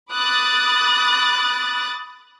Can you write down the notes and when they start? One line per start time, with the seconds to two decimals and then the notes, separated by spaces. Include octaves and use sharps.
0.13 B5 D6 D#6 F#6 A6